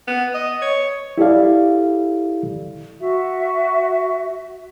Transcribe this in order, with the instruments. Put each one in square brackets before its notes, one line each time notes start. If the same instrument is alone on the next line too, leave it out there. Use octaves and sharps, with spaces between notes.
[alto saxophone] B3
D#5
C#5
[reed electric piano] E4 G4 A4 D5 F5
[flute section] F#4 E5